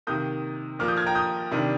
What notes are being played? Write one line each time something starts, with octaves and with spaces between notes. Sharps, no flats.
C3 D#3 A#3 D#6 G6
A#2 F3 A#3 D6 F6
D#6 G6
F6 G#6
G5 A#5
D#6 G6
C3 D#3 G3 D4